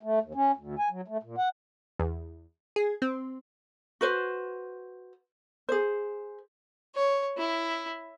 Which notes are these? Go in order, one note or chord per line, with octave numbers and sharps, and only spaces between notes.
A3
D#2
C#4
D2
G#5
F#3
A3
A#2
F#5
E2
G#4
C4
F#4 B4 C5
G#4 C5
C#5
E4